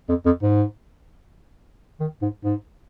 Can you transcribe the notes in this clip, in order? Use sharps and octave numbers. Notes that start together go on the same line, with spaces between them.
F2
F2
G#2
D#3
G#2
G#2